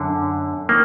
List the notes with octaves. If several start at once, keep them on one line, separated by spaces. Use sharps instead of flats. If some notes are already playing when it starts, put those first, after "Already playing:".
Already playing: F#2 D3
D#3 A#3